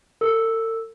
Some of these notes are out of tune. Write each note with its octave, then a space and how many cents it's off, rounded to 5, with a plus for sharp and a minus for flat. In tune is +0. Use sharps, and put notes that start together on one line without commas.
A4 +45 E6 +0